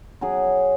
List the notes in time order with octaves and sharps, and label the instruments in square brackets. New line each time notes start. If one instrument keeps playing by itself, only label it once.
[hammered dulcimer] F#3 C#4 G#4